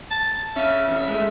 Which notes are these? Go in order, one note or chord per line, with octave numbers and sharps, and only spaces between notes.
A5
C#4 E5 F5
E3 C#4
G#3 A3